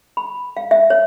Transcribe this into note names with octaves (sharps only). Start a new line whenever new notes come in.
B5
F5
E5
C#5